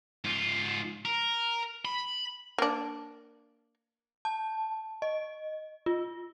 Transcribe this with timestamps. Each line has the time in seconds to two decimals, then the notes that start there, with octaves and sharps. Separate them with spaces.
0.25 G#2 F4
1.05 A#4
1.85 B5
2.58 A#3 D4
4.25 A5
5.02 D#5
5.86 F4